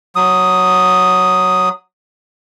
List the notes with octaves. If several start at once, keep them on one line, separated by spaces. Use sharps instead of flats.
F#3 D#6